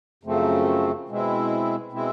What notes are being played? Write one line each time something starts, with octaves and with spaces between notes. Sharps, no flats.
F#2 C#3 F3 A3 C4
B2 G#3 C4 E4
B2 G#3 C4 E4